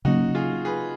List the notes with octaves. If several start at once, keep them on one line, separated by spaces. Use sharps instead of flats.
C#3 F#3 A#3 C#4 D#4 F#4
F4 G#4
G#4 B4